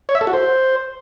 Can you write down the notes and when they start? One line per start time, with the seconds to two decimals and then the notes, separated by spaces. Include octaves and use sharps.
0.09 C#5
0.15 E5
0.21 A4
0.27 F#4
0.33 C5